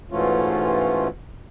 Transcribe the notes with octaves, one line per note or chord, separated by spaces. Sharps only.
G#2 B2 E3 A3 C#4 F4